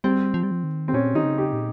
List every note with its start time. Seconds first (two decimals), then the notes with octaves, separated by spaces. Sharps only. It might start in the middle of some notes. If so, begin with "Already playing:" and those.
0.04 G3 C4
0.34 F3
0.43 G3
0.51 F3
0.64 D#3
0.88 C4
0.93 A#2 C#4
1.15 D#3 D#4
1.23 C#3
1.38 G4
1.53 A#2